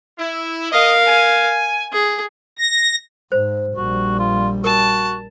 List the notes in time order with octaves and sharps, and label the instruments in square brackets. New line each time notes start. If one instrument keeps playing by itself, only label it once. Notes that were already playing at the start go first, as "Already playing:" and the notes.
[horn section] E4
[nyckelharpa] A#4 F5 [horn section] D#5
[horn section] G#5
[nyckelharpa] G#4
[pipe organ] A#6
[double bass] G#2 [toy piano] C5
[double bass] A#1 G3 [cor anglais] F#4
[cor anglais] F4
[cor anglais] F#4 [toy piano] A#4 [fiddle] A5